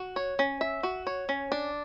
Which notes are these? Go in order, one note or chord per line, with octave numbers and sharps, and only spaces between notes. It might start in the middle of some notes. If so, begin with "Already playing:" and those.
Already playing: F#4
C#5
C#4
E5
F#4
C#5
C#4
D4